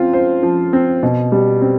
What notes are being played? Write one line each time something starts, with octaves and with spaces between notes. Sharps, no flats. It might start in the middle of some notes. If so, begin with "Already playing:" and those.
Already playing: F3 C4 F4
C5
F3
C4
B2
G3
C4